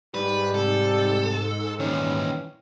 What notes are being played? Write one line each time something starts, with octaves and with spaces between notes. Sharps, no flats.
G#2 G3 B4
C3 A4
A#2 D#3 E3 C#4